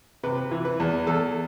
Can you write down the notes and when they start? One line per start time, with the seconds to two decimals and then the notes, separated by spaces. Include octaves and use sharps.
0.23 C3 B4
0.51 E3
0.65 B4
0.80 E2
1.07 E2 A4